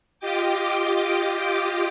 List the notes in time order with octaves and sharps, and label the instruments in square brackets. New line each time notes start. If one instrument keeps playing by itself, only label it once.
[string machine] F4 G4 D#5 G5 D6